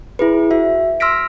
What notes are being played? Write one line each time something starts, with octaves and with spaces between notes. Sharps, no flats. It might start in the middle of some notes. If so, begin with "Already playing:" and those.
E4 G#4 B4
F#4 E5
C6 E6 F6 A#6 B6 D7